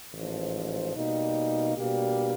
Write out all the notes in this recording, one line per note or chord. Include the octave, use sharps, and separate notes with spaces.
A1 G#2 F3
B2 G3 A#3 D#4
B2 G3 A#3 D4 G4